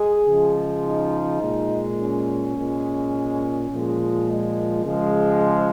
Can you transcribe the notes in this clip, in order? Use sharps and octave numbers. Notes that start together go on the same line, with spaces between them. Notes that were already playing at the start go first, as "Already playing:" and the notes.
Already playing: G#3 G#4
C#3 F3 G#3
D#4
A#2 G#3
C#4
A#2 G#3
A#2 F3 G#3
G#3
C#3 F3 G#3